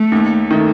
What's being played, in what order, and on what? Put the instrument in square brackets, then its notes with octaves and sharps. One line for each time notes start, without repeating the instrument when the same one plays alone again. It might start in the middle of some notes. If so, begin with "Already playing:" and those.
Already playing: [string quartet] A3
[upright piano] D#2
D#3 A3